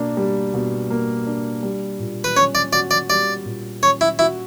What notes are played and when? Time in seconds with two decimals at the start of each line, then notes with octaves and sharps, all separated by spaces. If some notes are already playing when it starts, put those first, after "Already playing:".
Already playing: B2 A#3 D4
0.17 G3
0.54 B2
0.90 A#3
1.27 D4
1.63 G3
1.99 A#2
2.24 B4
2.36 C#4 C#5
2.55 D5
2.72 F#4 D5
2.91 D5
3.09 G3 D5
3.46 A#2
3.82 C#4 C#5
4.01 E4
4.19 E4 F#4